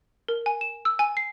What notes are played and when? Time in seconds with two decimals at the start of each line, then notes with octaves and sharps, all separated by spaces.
0.28 A#4
0.46 G#5
0.61 E7
0.85 E6
0.99 G#5
1.17 C7